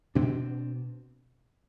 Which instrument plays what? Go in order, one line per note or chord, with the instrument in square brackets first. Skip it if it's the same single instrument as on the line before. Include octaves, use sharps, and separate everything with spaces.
[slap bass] B2 C4 D4